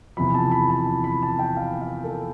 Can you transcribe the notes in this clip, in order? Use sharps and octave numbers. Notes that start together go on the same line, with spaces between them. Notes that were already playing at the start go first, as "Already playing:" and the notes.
E2 C3 F3 B5
A5
B5
A5
B5
B5
A5
G5
F5
F5
A4